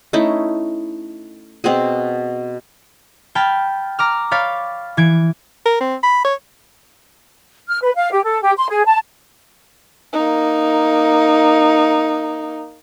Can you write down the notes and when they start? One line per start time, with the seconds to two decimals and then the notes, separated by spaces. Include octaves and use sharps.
0.13 A3 C#4 D#4 E4
1.64 B2 C4 F#4 G#4
3.35 G5 A5 B5 F6 G#6
3.99 A#5 D6 F6
4.31 C#5 F5 B5 D6 G6 A6
4.97 E3 G#6 D7
5.66 A#4
5.81 C4
6.03 B5
6.24 C#5
7.69 F6
7.83 B4
7.95 F5
8.11 G4
8.23 A4
8.41 G4
8.57 C6
8.70 G#4
8.85 A5
10.13 A#3 D#4